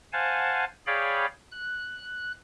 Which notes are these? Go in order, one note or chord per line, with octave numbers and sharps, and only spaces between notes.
C5 F5 F#5 G#5 A5
G#4 C#5 D5 F5 G5 B5
F#6